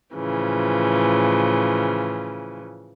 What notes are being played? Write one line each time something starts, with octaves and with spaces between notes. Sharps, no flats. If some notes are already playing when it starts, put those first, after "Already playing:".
A2 C#3 E3 F3